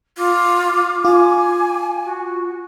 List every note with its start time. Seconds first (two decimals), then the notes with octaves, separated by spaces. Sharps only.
0.18 F4 D6
1.05 F4 G#5
2.04 F#4